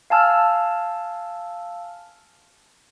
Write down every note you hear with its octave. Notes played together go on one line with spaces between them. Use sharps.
F5 G#5 A5 E6 F6